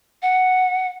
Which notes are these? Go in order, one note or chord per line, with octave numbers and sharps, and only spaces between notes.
F#5